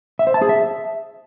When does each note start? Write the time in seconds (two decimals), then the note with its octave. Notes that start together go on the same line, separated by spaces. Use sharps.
0.19 E5
0.27 C5
0.34 A5
0.42 G#4
0.49 E5